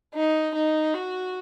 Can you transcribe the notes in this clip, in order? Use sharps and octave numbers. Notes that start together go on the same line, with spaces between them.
D#4
D#4
F#4